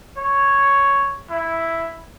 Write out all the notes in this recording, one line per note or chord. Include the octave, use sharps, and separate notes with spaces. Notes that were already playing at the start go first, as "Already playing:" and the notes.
C#5
E4